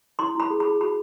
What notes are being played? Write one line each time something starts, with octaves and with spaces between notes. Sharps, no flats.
E4 C6
E4 B5
G#4
B5
G#4
F#4 B5